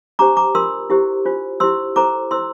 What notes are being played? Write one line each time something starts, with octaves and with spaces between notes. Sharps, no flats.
D4 G4 C5 A#5 D6
A#5 D6
D4 F4 A#4 C6 E6
E4 G4 C5
D4 F4 C5
E4 G4 C5 C6 E6
E4 A4 C5 A#5 D6
E4 A4 C5 C6 E6